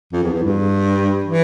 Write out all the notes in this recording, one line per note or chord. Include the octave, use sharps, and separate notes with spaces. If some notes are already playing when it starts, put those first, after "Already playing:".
F2
E2
E2
G2
E3